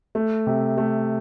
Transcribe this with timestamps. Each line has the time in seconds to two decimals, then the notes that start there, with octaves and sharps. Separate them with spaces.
0.15 A3
0.47 C3
0.78 A3